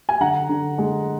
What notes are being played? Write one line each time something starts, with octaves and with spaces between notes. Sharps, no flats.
G#5
D3 F#5 A#5
D3
G#3